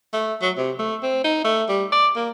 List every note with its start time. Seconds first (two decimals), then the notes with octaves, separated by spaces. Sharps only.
0.13 A3
0.42 F#3
0.57 C3
0.79 A3
1.03 C4
1.24 D#4
1.44 A3
1.68 G3
1.92 D5
2.16 A#3